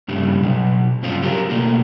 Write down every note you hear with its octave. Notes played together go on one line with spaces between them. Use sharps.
G2 C#3 G3
B2 F#3
G2 C#3 C4 F4
F#3 G4 A#4
B2 A3 A#3